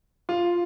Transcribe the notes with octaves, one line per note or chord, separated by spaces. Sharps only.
F4